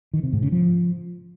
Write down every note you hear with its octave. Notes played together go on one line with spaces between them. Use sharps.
D#3
C3
G#2
C#3
F3